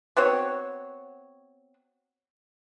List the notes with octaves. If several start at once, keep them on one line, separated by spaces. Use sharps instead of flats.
B3 C4 F#4 C#5